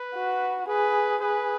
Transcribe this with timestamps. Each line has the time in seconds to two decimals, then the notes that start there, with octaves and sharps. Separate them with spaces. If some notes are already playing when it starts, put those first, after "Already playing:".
Already playing: B4
0.15 F#4
0.68 G#4 B4
1.22 G#4 B4